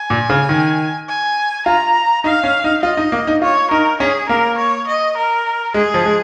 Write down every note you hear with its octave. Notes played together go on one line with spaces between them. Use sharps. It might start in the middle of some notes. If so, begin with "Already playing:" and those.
Already playing: G#5
A#2
C#3
D#3
G#5
F4 A#5
D#4 F5
C#4
D#4
F4 D#5
D#4
A#3
D#4
F4 C#5
D#4 A#4
C#4 G#4
A#3 A#4
C#5
D#5
A#4
G#3 G#4
F3
G#3